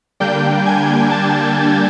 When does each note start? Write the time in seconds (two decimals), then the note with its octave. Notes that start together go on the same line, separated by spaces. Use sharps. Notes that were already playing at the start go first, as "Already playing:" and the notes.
0.20 D3 G3 A#3 D4 G5 G6
0.66 G#5 G#6
1.11 A5 A6